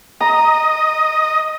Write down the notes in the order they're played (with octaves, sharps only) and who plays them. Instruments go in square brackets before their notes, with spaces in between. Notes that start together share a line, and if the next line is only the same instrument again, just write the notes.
[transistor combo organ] D#5 [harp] A#5